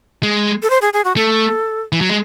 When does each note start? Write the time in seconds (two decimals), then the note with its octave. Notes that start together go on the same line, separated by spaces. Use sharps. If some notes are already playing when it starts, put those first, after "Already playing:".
0.23 G#3
0.63 A4
0.70 C5
0.82 G#4
0.93 G#4
1.05 F#4
1.16 A3 A4
1.92 E3
2.01 F#3
2.10 G#3